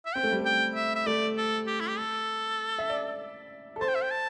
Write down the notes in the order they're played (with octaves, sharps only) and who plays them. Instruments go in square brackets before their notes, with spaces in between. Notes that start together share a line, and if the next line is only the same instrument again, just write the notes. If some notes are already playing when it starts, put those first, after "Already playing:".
[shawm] E5
[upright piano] C4 [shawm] G5
[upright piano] A3
G3
A3
[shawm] G5
E5
E5
[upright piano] A3 [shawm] D5
[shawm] A4
G4
E4
G4
A4
[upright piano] E5
D5
A4
[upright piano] C5 [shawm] A5
[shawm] G5
E5
G5
A5